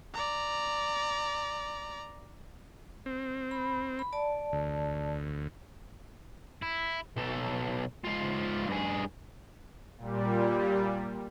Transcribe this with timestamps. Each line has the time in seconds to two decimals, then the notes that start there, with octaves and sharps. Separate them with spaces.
0.13 D5 A#5
3.06 C4
3.51 B5
3.99 B5
4.13 D5 A5
4.53 D2
6.62 E4
7.17 B1 A4
8.05 G#2 F4
8.68 G2 G#4
9.98 A#2 G3